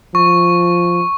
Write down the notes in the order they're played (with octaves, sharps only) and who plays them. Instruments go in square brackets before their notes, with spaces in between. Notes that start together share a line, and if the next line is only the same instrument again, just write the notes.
[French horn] F3 [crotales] C#6